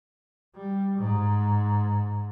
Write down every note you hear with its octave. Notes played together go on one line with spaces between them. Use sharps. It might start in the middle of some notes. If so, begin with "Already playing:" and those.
G3
G#2